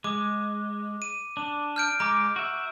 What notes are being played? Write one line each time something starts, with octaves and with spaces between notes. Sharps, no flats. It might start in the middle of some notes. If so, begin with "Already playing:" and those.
G#3 D6
D#7
D4
F6 G6 D7
G#3 A#5 D6
F#4 E5